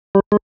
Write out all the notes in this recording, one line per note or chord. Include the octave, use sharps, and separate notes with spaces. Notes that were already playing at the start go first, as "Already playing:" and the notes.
G3
G#3